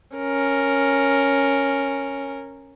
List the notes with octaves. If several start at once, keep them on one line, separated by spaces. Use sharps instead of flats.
C#4 A#4